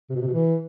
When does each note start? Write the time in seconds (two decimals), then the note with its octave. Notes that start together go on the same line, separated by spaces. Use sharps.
0.10 C3
0.16 B2
0.21 C3
0.27 B2
0.33 E3